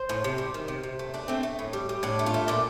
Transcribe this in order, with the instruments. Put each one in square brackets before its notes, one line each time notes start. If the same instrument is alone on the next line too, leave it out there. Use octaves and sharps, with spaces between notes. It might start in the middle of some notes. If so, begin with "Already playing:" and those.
Already playing: [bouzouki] C5
A2
C3
G3
D#3
C3
C3
A3
A3 D4
A3 C4
A3
A2
G3
G3
A2 D4
A3
F4
A3
A#2 D5